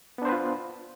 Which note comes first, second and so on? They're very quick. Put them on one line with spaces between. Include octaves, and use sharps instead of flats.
B3 D4 C5 B4 F4